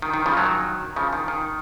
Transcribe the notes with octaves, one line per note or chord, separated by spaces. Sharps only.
D#3
D#3
C#3 F3
D#3 F#3
C#3 F3
D#3
D#3